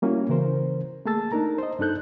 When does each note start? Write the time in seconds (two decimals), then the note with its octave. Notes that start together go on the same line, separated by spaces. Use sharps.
0.02 G3 A#3 C#4 E4 F#4
0.29 C#3 E3 A#4 C5
1.05 A3 A#3 G#4 A5 E6 A6
1.32 D4 D#4 A#4 A#5
1.58 C5 D#5
1.79 G2 D4 D#4 A4 F#6 G6